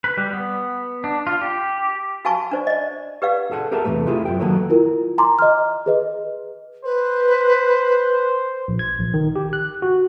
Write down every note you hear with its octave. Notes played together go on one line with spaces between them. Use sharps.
B4
G3
B3
D4
F4
G4
F#4 F5 G#5 A5 C#6
D4 C5 D5
D5 D#5
G4 B4 D5 F5
G#4 A4 F#5
G4 G#4 A#4 E5 A5
E2 C3 D#3 F#3 A3 B4
A3 E4 F4 G4 G#4
F#2 B3 G5
D#3 F#3 A#3 B3 A4 C#5
E4 F4 A#4
G#5 A#5 C6 D6
D#5 F6
G#4 B4 D#5
B4 C5
A#1
G#6
A#1
D#3
G4
F#6
F#4